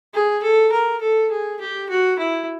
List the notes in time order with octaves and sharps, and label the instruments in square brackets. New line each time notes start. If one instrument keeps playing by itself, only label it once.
[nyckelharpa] G#4
A4
A#4
A4
G#4
G4
F#4
E4